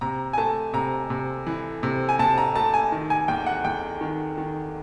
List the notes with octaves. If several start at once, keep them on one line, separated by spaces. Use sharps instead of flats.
C3 A#5
G#5
A3 A5
C3 A#5
C3
E3
C3
G#5
C3 A5
A#5
A3 A5
G#5
D#3
G#5
E2 G5
F#5
E2 G5
D#3
D#3